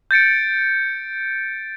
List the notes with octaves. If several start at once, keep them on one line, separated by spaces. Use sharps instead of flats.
G6 A6 C#7 D7